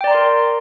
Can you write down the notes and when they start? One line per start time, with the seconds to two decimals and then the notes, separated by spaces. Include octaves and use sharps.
0.01 G5
0.04 D5
0.08 A#5
0.11 C6
0.14 A#4